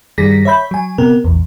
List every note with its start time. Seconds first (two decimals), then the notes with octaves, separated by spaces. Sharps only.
0.18 G2 D#3 G3 G#4 A#6 B6
0.45 C#5 E5 B5 G6
0.71 F#3 G#5
0.98 C3 B3 A#4
1.24 A#1 E2